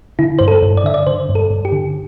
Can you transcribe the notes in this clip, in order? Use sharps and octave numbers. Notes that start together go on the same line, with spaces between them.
D3 E4
G2 C5
A4
G2
D5
D3 E5
D5
D3 C5
G2
A4
G2
G4
D3